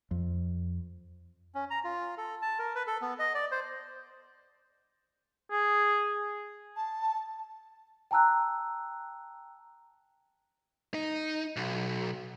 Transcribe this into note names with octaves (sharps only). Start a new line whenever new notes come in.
F2
C#4
A#5
F4
A4
A5
A#4
B4
A4
B3
D#5
D5
C5
G#4
A5
G5 A5 A#5 E6 F#6
D#4
B1